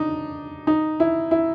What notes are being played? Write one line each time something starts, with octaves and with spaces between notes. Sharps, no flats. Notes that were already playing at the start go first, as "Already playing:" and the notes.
Already playing: D4 D#4
D#4
E4
E4